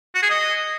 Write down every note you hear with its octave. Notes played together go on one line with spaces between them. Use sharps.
F#4
G#4
D#5